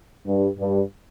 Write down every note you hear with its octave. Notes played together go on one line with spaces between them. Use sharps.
G2
G2